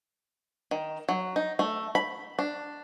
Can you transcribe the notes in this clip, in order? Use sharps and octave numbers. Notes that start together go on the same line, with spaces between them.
D#3
F#3
D#4
A3
B5
D4